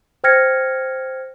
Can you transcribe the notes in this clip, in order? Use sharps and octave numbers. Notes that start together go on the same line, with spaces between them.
C5 G5 F6 G#6 A#6 C#7